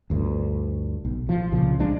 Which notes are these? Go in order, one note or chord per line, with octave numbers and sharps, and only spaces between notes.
G1 D2 G2
B1
A1 F3
C2 A#2 C#3 F3
C2 F3 G#3 D4